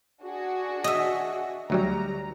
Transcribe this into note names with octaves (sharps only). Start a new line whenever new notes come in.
D4 F#4 G#4
D#5 E5
D2 F#3 G3 A#5